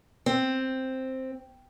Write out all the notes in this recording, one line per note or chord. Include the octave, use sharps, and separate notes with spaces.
C4